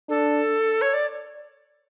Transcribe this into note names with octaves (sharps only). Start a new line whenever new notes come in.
D4 A4
C#5
D5